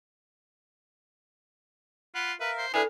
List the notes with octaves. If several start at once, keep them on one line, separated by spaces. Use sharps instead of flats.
F4 F#5 B5 F#6
A#4 B4 E5 F5
C5
D4 E4 G#4 A4 B4 G#5